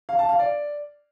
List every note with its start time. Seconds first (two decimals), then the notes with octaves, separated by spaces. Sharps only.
0.09 F5
0.19 A5
0.29 F5
0.39 D5